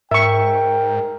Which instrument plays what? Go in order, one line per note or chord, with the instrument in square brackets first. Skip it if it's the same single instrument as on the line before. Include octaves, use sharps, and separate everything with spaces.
[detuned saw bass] G#2 [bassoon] A#4 [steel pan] E5 C#6 [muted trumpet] G5